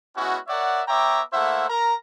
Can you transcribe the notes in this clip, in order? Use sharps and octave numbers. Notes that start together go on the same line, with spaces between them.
G#3 B3 C#4 E4 F#4
A#4 C#5 D5 E5 F#5
B3 C#5 E5 G5 A#5 D6
A3 A#3 E4 C5 E5 F#5
A#4 A#5